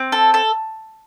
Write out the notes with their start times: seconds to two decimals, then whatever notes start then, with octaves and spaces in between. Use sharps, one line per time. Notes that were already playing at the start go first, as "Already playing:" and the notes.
Already playing: C4
0.12 A4
0.34 A4